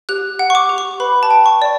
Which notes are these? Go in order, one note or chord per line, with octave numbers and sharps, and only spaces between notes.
G4 F#6
F#5
C#6
D6
G4
C#6
B4 B5
A5
G5
C#6
D5